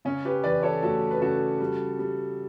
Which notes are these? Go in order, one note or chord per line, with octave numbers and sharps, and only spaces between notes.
C#3 C#4
G4 B4
E3 B4 D5
A4 C#5
A3 F#4 A4
B4
C#3 F#4 A4
G3
G3